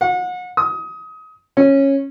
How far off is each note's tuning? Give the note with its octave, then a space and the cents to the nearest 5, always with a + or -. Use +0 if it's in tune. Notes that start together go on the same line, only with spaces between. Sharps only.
F#5 -35
D#6 +25
C#4 -15